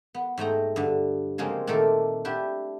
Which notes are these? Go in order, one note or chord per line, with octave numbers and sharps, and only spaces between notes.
B3
G#2 A3 G5 A#5
G2 D3
C#3 F3 G#3 A#3 C4
A#2 D#3 A3 A4 A#4 D5
D4 E4 G4 B4